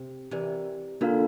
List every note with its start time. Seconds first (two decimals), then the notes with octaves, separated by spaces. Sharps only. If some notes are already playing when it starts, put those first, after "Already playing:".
Already playing: C3
0.31 C3 E3 C4 G4 A#4 D5
1.01 D3 A#3 D4 F4 A#4 F5